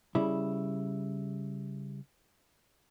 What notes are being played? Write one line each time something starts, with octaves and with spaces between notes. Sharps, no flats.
C#3 G3 E4